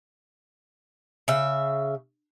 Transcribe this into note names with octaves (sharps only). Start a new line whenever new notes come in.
C#3 E5